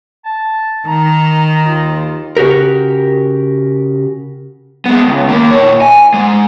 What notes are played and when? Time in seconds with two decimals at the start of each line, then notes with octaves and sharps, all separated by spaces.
0.25 A5
0.88 D#3 A#5
1.65 D#2 F4
2.37 C#3 F#4 G4 A#4
4.86 G#3 B3
5.08 C#2
5.28 D#3 A#3
5.51 A#2 C#5
5.82 G#5
6.14 G#2 G#3